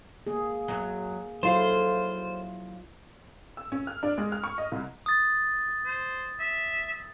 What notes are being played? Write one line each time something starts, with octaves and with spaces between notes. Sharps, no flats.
A#3 G#4
F#2 F#3
F#3 E4 F4 A4 C5 F5
E6
C#4
F6
D4
G#3
F6
C#6
D#5
C2
D#6 A6
C5
E5